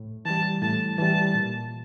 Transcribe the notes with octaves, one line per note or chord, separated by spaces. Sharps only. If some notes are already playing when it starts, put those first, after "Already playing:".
Already playing: A2
E3 G3 A5
A2 A5
E3 G3 A5
A#2